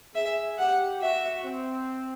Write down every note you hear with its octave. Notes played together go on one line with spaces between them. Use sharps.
G#4 E5
G4 F#5
F#4 E5
C4